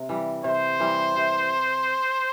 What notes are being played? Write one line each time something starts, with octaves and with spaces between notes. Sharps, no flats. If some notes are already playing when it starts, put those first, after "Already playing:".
Already playing: C3
E3 G3
C3 C5
E3 G3
C3